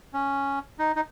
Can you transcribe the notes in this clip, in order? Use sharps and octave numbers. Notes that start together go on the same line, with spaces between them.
C#4
D#4
D#4